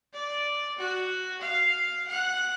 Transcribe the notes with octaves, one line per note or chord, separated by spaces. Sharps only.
D5
F#4
F5
F#5